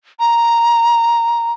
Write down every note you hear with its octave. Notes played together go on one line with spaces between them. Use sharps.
A#5